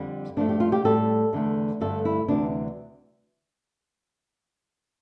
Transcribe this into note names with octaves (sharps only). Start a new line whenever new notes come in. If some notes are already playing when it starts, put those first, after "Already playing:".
Already playing: F2 D3 G3
G2 F3 A3 D4
G4
F4
G4
A2 G3 A4
E2 D3 A3
G2 D3 A3 A4
E4
D2 C3 E3 G3 D4